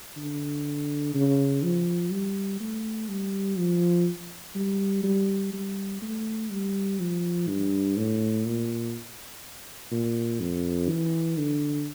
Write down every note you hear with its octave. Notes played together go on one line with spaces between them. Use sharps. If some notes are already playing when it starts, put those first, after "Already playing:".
D3
C#3
F3
G3
A3
G3
F3
G3
G3
G3
A3
G3
F3
G2
A2
A#2
A#2
F2
E3
D3